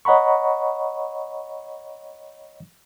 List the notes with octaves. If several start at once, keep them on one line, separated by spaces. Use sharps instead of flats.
C#5 D#5 F#5 A#5 B5 C#6